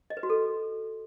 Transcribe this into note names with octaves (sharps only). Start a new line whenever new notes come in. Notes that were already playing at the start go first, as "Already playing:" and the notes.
D#5
B4
F#4
A4